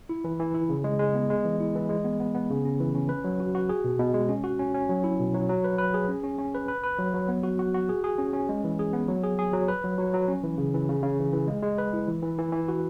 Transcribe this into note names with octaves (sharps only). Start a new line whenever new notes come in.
E4
E3
E3
E4
C#3
G#3
G#3
B3
G#3
E3
E4
E3
G#3
B3
B3
B3
C#3
C#4
E3
C#4
B4
F#3
F#4
F#4
G#4
B2
B2
G#3
C#4
F#4
C#4
C#4
F#3
E4
B2
F#3
F#3
B4
B4
G#4
C#4
C#4
C#4
B4
B4
B4
F#3
F#3
B3
F#4
F#4
F#4
G#4
G#4
C#4
C#4
G#3
E3
G#4
B3
F#3
G#4
G#4
F#3
B4
F#3
F#3
F#3
C#4
E3
C#3
E3
C#3
C#3
E3
E3
G#3
G#3
B4
E4
E3
E3
E3
E3
F#4